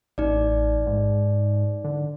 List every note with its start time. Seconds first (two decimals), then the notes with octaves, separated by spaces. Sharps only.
0.18 A1 D#4 D5
0.86 G#2
1.84 D3